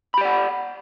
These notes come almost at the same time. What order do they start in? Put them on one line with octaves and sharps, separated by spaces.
B5 G4 D5 F#5